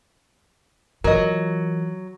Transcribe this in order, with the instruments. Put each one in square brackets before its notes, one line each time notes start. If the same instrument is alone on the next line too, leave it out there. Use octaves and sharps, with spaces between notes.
[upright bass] E3 F4 [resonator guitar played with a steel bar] F#3 [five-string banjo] A#4 D#5